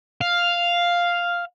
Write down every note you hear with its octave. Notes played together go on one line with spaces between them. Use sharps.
F5